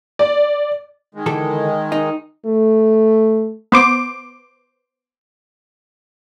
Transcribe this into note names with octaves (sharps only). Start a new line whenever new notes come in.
D5
D#3 G#3
D3 E3 A4
D#4
A3
B3 C5 D6